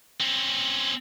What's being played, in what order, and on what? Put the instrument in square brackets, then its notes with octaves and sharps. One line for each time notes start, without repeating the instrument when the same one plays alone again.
[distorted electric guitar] C4 C#4